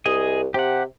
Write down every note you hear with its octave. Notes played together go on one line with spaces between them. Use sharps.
C2 G#4 D#5
C3 G4 F#5